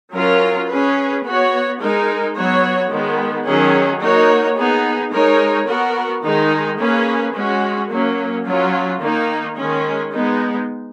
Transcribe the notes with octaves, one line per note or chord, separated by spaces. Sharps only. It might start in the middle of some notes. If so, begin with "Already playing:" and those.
F#3 C#4 F4 A#4
C#4 G#4 B4
B3 F#4 C#5
G#3 D#4 A#4
F#3 B3 F#4 C#5
D#3 G#3 B3
D#3 F#3 C#4 G#4
A#3 D#4 F#4 A#4 C#5
B3 D#4 G#4
G#3 D#4 A#4 C#5
B3 F#4 A#4
D#3 G#3 D#4
A#3 C#4 G#4 B4
G#3 C#4 F#4
F#3 A#3 C#4
F#3 C#4 F4
D#3 A#3 D#4
D#3 G#3 C#4
G#3 B3 D#4